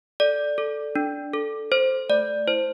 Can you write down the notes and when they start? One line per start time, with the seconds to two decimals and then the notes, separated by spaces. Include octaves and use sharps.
0.20 A4 D5
0.58 A4
0.95 D4
1.34 A4
1.72 A4 C5
2.09 A3 D5
2.47 E4 C5